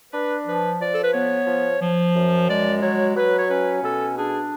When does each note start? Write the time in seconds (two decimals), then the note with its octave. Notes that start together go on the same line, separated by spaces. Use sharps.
0.12 D4 B4
0.45 F3 B4
0.79 F3 D5
0.94 A4
1.03 B4
1.13 B3 C#5
1.47 F3
1.81 F3
2.14 F#2
2.48 G#3 D5
2.81 F#3 C#5
3.16 F#3 B4
3.37 C#5
3.48 C#4 B4
3.82 B2 A4
4.16 D4 G#4